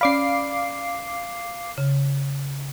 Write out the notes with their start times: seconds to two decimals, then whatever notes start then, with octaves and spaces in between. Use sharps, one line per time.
0.01 C#4 D5 F5 B5 D6 C7
1.78 C#3